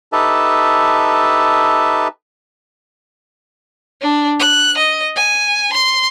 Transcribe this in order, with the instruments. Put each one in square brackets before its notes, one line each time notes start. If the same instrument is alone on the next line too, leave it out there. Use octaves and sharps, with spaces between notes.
[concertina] D#4 G4 A4 B4 E5 A5
[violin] D4
F#6
D#5
G#5
C6